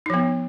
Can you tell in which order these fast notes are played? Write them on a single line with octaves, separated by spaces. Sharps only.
D#4 F3 B3